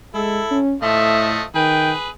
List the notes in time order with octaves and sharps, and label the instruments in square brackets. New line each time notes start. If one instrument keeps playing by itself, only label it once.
[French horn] G#3 [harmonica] E4 [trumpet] A4
[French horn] C#4
[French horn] A2 [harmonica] F3 A3 D#5 [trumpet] E5
[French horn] D#3 [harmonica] G#4 B4 [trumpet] G5